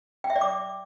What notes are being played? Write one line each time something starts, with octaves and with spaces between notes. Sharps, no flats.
G5
E5
D5
D6